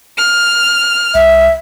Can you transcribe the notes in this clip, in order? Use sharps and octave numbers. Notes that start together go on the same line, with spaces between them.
F6
C2 E5